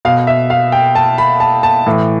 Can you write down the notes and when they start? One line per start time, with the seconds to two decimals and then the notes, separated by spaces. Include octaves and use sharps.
0.05 B2 F5
0.27 E5
0.50 F5
0.72 G5
0.95 A5
1.18 B5
1.40 A5
1.63 A5
1.86 A2 E3